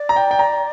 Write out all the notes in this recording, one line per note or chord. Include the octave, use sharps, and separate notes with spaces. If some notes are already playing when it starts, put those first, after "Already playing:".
Already playing: D5
A#5
G5
G5
A#5